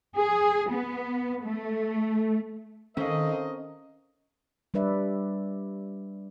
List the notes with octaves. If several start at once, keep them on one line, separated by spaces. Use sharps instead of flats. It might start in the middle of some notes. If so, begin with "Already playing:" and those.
G#4
B3
A3
D#3 C4 C#4 A4 A#4 C5 D#5 F5
G3 D4 B4 D5 E5